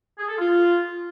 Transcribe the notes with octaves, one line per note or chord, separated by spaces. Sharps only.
G#4
A4
F4